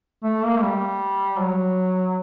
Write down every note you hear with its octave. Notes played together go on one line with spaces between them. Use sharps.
A3
A#3
A3
G3
F#3